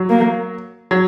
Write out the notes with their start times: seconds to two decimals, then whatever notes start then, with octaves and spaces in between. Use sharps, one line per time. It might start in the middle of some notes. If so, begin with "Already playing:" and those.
Already playing: F#3
0.10 A#3
0.91 F#3